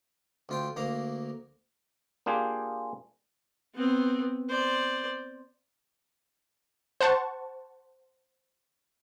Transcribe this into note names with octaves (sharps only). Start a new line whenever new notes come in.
D2 F4 G5
D2 A#3 F5 A#5
A#3 D4 F4 G4 G#4
B3 C4
C5 D5
C5 F#5 A5 C#6